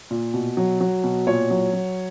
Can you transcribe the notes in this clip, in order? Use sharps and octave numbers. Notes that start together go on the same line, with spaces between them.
A#2
B2
F#3
F#3
B2
A#2 C#5
F#3
F#3